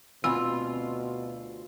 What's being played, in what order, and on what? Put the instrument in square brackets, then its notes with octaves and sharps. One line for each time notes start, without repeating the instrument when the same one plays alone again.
[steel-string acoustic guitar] D2 F4 [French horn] B2 [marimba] C4 G#5 B5 [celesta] E6